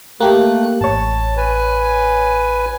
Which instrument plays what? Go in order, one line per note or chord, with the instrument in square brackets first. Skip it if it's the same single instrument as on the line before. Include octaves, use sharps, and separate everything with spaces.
[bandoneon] A3 F#6 [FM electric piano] A#3 G4
[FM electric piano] A1 C#5 [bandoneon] A5
[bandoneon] B4 G#5